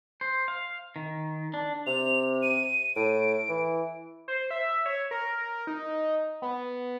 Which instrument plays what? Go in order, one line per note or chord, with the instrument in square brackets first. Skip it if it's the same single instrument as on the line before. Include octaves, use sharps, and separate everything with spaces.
[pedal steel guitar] C5
F5
D#3
D4
[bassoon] C3 [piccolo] F7
[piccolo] D#7
[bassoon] A2 [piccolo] D7
[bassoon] E3
[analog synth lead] C5
E5
C#5
A#4
D#4
B3